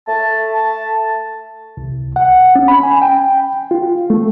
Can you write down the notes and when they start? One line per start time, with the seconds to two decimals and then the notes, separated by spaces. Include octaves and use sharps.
0.08 A3 A5
0.54 A5
1.77 C2
2.16 F#5
2.55 C#4
2.68 B5
2.83 G#5
3.02 G5
3.71 F4
4.10 A3